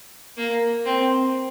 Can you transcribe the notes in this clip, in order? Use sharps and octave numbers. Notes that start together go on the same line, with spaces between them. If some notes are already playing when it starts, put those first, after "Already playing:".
A#3
C4